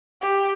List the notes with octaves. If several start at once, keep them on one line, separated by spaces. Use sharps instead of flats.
G4